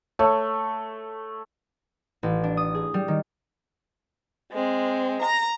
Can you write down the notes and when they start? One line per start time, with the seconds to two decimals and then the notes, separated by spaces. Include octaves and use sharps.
0.19 A3 C#5
2.23 A1
2.44 D4
2.57 D#6
2.74 G#4
2.94 G3
3.08 D#3
4.52 G#3 C4
5.22 A#5 A#6